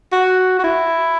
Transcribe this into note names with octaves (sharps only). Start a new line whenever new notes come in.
F#4
F#4
E4